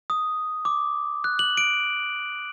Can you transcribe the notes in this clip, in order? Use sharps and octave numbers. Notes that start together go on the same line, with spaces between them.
D#6
D6
F#6
F#7
D7